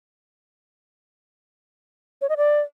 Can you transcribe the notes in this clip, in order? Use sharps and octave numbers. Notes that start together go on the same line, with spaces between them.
C#5
D#5
D5